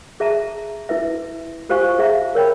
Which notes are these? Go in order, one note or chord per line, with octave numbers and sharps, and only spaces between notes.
G#4 E5 A5 A#5
E4 B4 E5
F4 G4 C5 F5 G#5 C#6
G#4 E5 F5 A#5
A#4 C#5 G5 B5